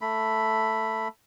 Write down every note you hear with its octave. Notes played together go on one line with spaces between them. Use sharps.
A3 B5